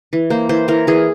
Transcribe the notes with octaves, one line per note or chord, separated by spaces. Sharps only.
E3
A#3 C5
E3 C5
E3 A#4
E3 G#4